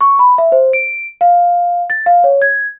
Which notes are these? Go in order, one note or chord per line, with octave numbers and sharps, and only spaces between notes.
C#6
B5
E5
C5
D7
F5
A6
F5
C#5
G#6